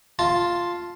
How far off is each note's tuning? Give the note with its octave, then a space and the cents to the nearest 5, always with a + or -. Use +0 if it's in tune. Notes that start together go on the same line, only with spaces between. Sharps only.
F4 +0 A5 +0